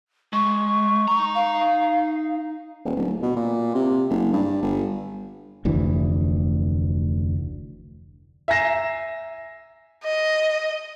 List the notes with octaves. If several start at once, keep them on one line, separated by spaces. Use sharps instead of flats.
G#3 C#6
D#4 A#5
F5
D#1
D1
B2
A#2
C3
F#1
G2
G1
F1 D2 E3
E5 G#5 A#5 A#6 C7 E7
D#5